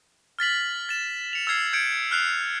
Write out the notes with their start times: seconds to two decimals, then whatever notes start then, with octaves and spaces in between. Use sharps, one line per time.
0.39 F6 A6 B6 F#7
0.89 A6 E7
1.33 C#7 F7
1.47 E6 F6 G#6 C7
1.73 G6 G#6 C#7 D7
2.11 F6 F#6 C7 F7